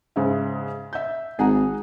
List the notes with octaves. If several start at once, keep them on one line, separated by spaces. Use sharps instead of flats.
G#2 C#3 E5
E5 G6
G#1 G#4 F#5 A#5